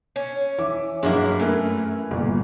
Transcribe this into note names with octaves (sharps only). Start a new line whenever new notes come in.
C#4
E3 E5 D6
G2 F#3 G#3 A#3 E4
F#2 E3 A3 A#4
G1 A#2